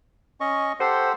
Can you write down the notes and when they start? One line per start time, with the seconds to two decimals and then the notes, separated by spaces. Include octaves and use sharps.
0.41 C#4 D#5 C#6
0.80 G4 A4 C5 F#5